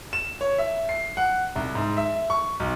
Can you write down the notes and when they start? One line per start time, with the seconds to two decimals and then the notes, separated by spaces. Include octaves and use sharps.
0.13 E7
0.41 C#5
0.58 E5
0.89 C7
1.17 F#5
1.56 C2
1.75 G#2
1.97 E5
2.30 C#6
2.60 B1